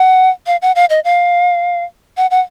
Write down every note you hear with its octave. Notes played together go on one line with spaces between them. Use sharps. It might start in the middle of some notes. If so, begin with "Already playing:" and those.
Already playing: F#5
F5
F#5
F5
D#5
F5
F#5
F#5